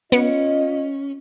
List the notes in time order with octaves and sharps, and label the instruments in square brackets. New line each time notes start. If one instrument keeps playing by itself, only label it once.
[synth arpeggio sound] B3 C#7 [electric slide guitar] C#4 [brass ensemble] F4 D#5